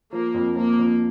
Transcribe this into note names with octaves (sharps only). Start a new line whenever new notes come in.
F3 A#3
F2
F3 A#3
F2